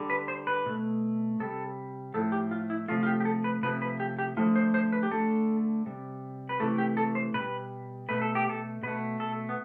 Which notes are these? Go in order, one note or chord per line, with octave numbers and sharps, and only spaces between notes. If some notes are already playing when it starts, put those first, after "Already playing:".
Already playing: D3 G3
B4
C5
B4
B2 A3
C3 G3 A4
A2 F3 A3 A4
G4
F4
E4
C3 F3 A3 F4
F4
G4
G4
A4
B4
C3 F3 A3 B4
B4
G4
G4
D3 F3 A3 F4
C5
C5
B4
G4
D3 A3 A4
C3 G3
B4
C3 E3 A3 A4
G4
A4
C5
B2 G3 B4
B2 A3 B4
A4
G4
A4
B2 A3 B4
A4
B3